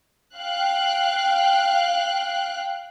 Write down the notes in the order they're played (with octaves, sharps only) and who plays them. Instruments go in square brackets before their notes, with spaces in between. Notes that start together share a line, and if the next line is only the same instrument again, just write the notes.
[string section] F5 G5 F#6